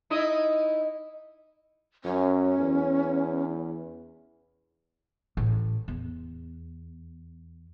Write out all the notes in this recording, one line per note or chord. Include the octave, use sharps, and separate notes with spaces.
D#4 E4 D#5
F#2 C#4
E2
A1
E2